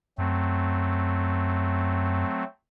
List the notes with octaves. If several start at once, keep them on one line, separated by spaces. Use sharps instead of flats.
F#2 F#3 A3 C4